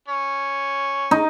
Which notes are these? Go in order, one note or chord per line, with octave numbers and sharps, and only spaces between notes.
C#4
D#4